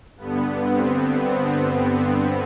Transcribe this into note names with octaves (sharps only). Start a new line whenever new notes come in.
G2 D3 B3
C4
B3
B3